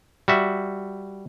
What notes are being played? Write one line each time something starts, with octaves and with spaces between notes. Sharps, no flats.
G3 F#4 E5